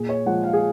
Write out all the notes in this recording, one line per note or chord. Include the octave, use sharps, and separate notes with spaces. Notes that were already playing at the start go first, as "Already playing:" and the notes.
Already playing: A#2 G#4
C#5
F3 G#3 F#5
F5
G#4